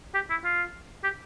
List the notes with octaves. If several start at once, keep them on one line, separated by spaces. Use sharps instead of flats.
G4
E4
F4
G4